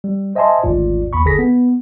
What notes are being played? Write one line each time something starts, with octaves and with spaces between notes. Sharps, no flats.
G3
C5 D#5 E5 G#5 A5 C6
G#1 D2 G#2 F4 D5
D#2 B5 C#6
G1 D3 G#4 A4 A#6 B6
B3